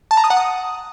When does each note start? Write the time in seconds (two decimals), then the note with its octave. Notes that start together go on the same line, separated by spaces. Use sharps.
0.11 A5
0.17 A#5
0.24 D#6
0.30 F#5
0.37 D#6